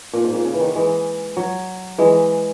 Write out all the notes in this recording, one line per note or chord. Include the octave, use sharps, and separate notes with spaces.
A#2
G#2
A#2
C#3
E3
D#3
E3 G#3
F#3
E3 G#3